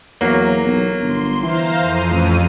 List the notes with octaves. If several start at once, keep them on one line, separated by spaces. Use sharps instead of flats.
E2 F#3 A#3
B1
G1 C6
E3 C5 F5 A#5
F2 D#7
A1